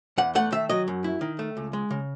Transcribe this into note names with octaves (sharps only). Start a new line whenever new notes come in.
E2 F#5
A3 F#5
D#3 E5
F#3 D#5
F#2
E4
D#3
A3
C#2
G#3
C#3